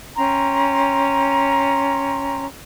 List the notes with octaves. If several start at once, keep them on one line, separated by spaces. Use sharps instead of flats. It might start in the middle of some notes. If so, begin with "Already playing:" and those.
C#4 G5 A#5 C6